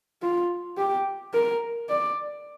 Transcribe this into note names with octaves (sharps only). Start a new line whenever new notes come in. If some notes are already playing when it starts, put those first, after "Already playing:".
F4
G4
A#4
D5